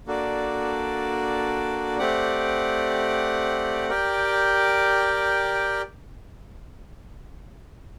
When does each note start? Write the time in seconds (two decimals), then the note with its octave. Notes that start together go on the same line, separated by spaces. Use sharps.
0.07 A#3 D4 F#4 A4 D5
1.98 A3 C4 G4 D5 F#5
3.90 G4 A#4 D5 G5